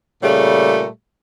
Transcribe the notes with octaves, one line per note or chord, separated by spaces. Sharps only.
A#2 C#3 G3 A3